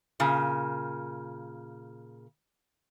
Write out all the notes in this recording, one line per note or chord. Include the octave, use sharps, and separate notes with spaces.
A#2 C#3